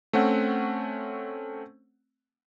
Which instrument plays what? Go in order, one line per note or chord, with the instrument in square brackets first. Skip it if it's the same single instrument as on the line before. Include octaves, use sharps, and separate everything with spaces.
[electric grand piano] A3 C4 C#4 F#5